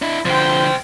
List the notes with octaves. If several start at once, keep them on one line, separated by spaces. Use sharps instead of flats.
D4 E4
C2 D3 F3 C5 G5